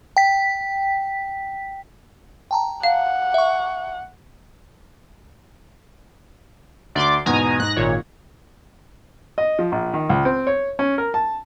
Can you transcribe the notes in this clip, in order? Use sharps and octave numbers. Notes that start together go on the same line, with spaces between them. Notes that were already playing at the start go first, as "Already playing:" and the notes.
G5 B6
G5 A5 A#5
F5 F#5
E5 C#6
D2 D5 C6 D6
E2 G#2 B2 G#5 A#5 D#6
G#2 F#6 A#6
G#1 A#2 C#5
D#5
F3
A#1
D#3
C#2
C4
C#5
C#4
A#4
A5